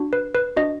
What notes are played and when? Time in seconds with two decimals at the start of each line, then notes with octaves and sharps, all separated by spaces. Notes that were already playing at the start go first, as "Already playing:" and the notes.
Already playing: D4 F#4
0.13 B4
0.35 B4
0.57 D4 F#4 D#5